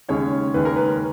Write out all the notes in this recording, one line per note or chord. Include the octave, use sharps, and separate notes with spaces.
D#2 C#3 G#3 C#4 C#5
D#2 C#3 G#3 C#4 B4
A#4
B4